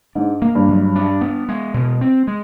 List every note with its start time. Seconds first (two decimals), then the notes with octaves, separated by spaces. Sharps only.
0.15 G#2 D4
0.42 A#3
0.55 G2
0.69 F#3
0.96 D4
1.21 B3
1.49 G#3
1.74 B2
2.01 C4
2.27 G#3